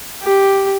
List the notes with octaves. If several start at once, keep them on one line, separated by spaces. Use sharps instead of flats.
G4